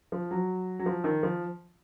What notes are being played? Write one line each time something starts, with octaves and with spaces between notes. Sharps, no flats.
F3
F#3
F#3
F3
D#3
F3